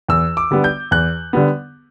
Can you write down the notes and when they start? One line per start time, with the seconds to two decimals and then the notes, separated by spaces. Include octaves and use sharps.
0.09 E2 E6
0.37 D6
0.51 D3 G3 B3
0.64 G6
0.91 E2 F#6
1.33 D3 G3 B3